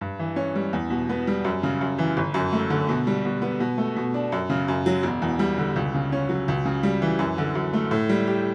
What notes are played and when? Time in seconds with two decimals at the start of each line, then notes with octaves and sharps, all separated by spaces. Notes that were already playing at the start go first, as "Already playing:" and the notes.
0.01 G2
0.19 E3
0.36 C#4
0.55 G3
0.73 E2
0.90 B2
1.09 B3
1.27 G3
1.44 F#2
1.63 C#3
1.81 F#2
1.98 E3
2.17 G1
2.34 F#2
2.52 A3
2.70 D3
2.89 B2
3.07 G3
3.25 B2
3.42 B3
3.60 B2
3.78 A3
3.97 B2
4.14 D4
4.32 F#2
4.50 C#3
4.68 F#2
4.86 F#3
5.03 E1
5.22 E2
5.39 G3
5.58 D3
5.76 C#2
5.94 C#3
6.12 C#4
6.29 F#3
6.48 C#2
6.65 C#3
6.83 G3
7.02 E3
7.19 F#2
7.38 D3
7.55 F#2
7.73 A3
7.91 A2
8.09 G3
8.27 G4